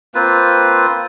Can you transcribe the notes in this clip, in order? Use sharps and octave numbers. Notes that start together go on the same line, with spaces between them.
A#3 C4 F4 B4